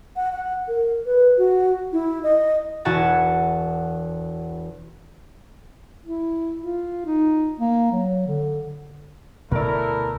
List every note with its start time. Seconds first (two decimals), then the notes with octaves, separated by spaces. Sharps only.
0.16 F#5
0.32 F#5
0.68 A#4
1.06 B4
1.38 F#4
1.93 E4
2.23 D#5
2.85 E1 E3 E4 F#4 G#5 A5
6.06 E4
6.63 F4
7.06 D#4
7.60 A#3
7.92 F#3
8.27 D3
9.51 D2 B2 A3 E4 A#4 D5